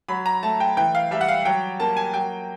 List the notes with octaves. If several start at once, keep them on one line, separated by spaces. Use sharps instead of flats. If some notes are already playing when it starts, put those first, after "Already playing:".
F#3 B5
A#5
A3 A5
G5
E3 G5
F5
G3 E5
F#5
F5
F#3 G5
A#3 A5
G#5
F#3 G5